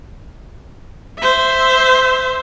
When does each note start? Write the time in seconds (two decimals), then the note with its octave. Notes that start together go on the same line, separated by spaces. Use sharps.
1.19 C5 E5